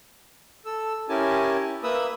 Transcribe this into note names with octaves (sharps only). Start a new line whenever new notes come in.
A4 E6
C#4 E4 G4 A#4 G#5 A5
A#3 B4 E5 B5 D#6 E6